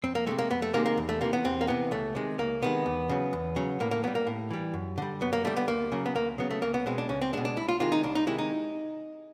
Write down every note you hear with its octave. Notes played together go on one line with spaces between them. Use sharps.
F2 C4
A#3
C3 D#3 G#3 A3
A#3
F2 B3
A3
C3 D#3 G#3 A#3
A#3
E2
A3
C3 E3 A#3
B3
E2 C4
A#3
C3 E3 B3
C#2 A3
C3 D#3 G#3
C#2 A#3
C3 D#3 G#3 B3
E2
C#3 F#3
E2
C#3 F#3
A2 A#3
A#3
E3 G3 B3
A#3
A2
E3 G3
F#2
D3 G3
F#2 B3
A#3
D3 G3 A3
B3
D2 A#3
C#3 F#3
B3
D2 A#3
C#3 F#3 B3
A3
C#2 A#3
B3
B2 G#3 C4
D4
C#2 C#4
C4
B2 G#3 D4
D4
C2 E4
F4
C3 D#3 G#3 F4
D#4
C2 D4
D#4
C3 D#3 G#3 E4
D#4